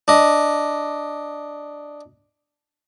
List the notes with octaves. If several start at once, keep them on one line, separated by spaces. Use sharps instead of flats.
D4 D#5